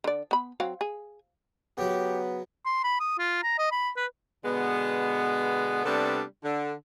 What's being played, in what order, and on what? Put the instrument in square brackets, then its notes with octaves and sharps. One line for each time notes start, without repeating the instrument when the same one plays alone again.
[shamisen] D3 D5
B3 B5
F#3 C4 F5
G#4
[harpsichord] C#3 F#3 [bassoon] B3 [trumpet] G4
[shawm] C6
B5
D#6
F4
A#5
D#5
B5
B4
[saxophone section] B2 D3 G#3 B3
C3 G3 A3 B3 D4
D3